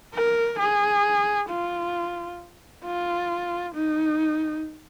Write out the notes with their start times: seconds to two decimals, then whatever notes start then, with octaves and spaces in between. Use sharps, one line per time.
0.14 A#4
0.59 G#4
1.49 F4
2.85 F4
3.75 D#4